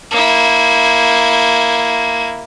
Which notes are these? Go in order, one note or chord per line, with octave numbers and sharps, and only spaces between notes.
A#3 E4